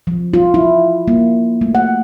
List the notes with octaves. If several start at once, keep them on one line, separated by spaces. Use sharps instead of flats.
F3
F4
E4
A#3
A3
F#5